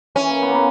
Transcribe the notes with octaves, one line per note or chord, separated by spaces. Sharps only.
E3 C#4
A#3
B3
A#3
B3